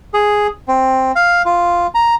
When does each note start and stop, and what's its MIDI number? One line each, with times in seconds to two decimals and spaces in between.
0.14 0.47 68
0.68 1.12 60
1.15 1.42 77
1.46 1.87 65
1.95 2.15 82